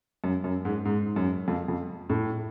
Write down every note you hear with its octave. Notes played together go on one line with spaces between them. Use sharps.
F#2
F#2
G#2
G#2
F#2
F2
F2
A2